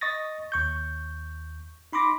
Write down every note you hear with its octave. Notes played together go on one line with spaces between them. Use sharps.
D#5 C#6 D#6 A6 A#6
D#2 C#6 G6
D#4 B5 C6 D6 A#6